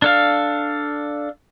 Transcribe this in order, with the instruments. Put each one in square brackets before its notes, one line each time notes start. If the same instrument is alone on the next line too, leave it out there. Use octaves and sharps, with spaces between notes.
[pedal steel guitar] D4 A4 F5